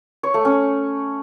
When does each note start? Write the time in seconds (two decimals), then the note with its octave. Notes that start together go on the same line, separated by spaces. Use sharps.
0.23 C#5
0.34 A3
0.45 C#4